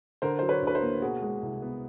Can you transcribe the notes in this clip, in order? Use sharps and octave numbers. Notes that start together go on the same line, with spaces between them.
D3 A#4 C5
F#3 C5
B4 C#5
D2
B4
A#4 C5
A#3
B2 F#4 G#4
G#3
C2
B3